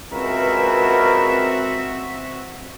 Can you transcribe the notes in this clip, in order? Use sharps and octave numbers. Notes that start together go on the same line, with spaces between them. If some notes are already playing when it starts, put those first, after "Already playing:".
C#2 C4 F#4 A#4 B4 E5